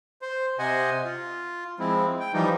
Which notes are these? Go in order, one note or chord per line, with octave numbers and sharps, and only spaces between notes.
C5
C3 C5 D#5 F#5 G#5
F4
F3 G#3 C4 E4
G5
E3 F3 G3 D#4